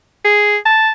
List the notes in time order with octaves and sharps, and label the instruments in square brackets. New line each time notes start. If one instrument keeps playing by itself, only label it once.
[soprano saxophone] G#4
A5